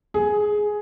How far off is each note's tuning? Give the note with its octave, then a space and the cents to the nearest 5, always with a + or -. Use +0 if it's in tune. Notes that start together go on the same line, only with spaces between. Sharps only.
G#4 +10